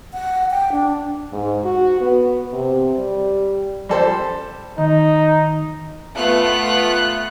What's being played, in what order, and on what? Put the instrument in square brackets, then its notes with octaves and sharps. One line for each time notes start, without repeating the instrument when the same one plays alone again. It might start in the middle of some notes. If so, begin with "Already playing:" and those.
[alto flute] F#5
G5
D4
[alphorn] G#2
F#4
B3
C3
G3
[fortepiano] G3 A4 C5
[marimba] D#3 [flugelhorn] D#4
[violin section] A3 B3 F4 F#6